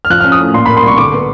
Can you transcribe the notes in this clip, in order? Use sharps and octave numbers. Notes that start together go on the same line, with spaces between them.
F6
F3 F#6
C#4 F6
D#6
A2
A#2 C6
A#3 B5
C6
C2 C#6
D3 D6
B3